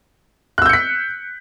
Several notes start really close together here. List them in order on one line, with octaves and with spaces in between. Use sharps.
F#6 E6 G6 C#7 B6